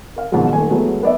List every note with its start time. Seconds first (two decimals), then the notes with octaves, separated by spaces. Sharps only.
0.16 A#4 F5
0.32 G#2 B2 D#3 F3 F#3 G#3
0.52 D#1 A3 G#5
0.70 E2 F#3 G#3 A3 B3
1.03 B3 D5 E5